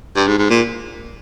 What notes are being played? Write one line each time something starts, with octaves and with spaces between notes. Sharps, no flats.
G2
G#2
G#2
A#2